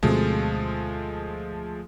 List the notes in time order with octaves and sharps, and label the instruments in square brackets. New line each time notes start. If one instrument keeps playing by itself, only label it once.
[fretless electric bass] D2 B2 C4 [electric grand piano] F3 G#3 A3